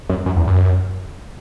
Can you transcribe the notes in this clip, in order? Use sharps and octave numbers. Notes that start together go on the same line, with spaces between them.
F#2
F#2
E2
F#2